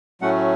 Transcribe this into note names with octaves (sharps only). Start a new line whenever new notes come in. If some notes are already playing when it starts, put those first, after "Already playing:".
A2 F#3 A3 C#4 F#5